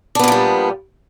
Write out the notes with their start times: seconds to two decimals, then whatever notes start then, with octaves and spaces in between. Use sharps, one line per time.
0.15 D4
0.19 B3
0.24 A#2
0.28 F3
0.32 G3